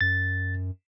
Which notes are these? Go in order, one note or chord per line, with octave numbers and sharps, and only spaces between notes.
F#2 A6